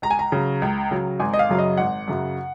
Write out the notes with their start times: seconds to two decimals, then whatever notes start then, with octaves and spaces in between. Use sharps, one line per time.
0.02 C#2 A#5
0.11 G#5
0.19 A#5
0.32 C#3 F#3
0.62 C#2
0.91 C#3 F#3
1.20 G#1 G#5
1.33 D#5
1.39 F5
1.49 F#2 C#3 F#3
1.58 D#5
1.77 G#1 F#5
2.08 F#2 C#3 F#3